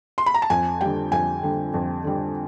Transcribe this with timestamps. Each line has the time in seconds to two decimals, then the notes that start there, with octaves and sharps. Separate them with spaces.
0.18 C6
0.26 B5
0.34 A#5
0.42 A5
0.50 F2 G#5
0.81 D3 G3 G5
1.12 F2 G#5
1.43 D3 G3
1.74 F2
2.04 D3 G3